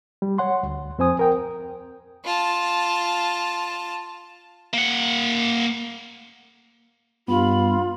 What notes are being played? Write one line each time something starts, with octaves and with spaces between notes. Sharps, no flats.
G3
C#5 F#5 C6
D2
F2 C4 C5 G#5 D#6
A#4 G5
F4 A5
A#3 F#5
G2 B3 F4 B5